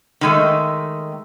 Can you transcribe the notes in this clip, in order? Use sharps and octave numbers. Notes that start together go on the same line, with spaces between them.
D#3 G#3 A3